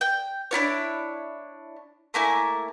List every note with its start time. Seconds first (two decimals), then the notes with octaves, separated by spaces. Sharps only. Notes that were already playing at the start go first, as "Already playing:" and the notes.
0.01 G5
0.51 D4 E4 F4 C#5
2.14 A3 A#3 E4 G#5